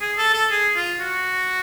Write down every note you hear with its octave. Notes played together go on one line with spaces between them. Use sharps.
G#4
A4
A4
G#4
F4
F#4